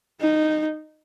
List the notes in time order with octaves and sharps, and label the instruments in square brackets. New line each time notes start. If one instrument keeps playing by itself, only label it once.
[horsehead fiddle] D#4